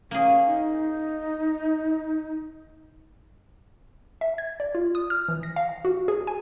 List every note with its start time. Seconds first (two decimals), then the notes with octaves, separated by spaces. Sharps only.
0.11 A#3 C#4 G#4
0.46 D#4
4.21 E5
4.38 G#6
4.60 D5
4.75 F4
4.95 D#6
5.10 F6
5.28 E3
5.43 A#6
5.56 F5
5.85 F#4
6.08 G#4
6.27 G#5